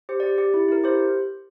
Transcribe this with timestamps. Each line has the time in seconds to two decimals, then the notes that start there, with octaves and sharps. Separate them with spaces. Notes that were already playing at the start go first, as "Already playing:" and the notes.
0.09 G4 C5
0.20 D5
0.23 G4
0.38 G4
0.54 E4
0.68 E4 A#4
0.84 G4 C5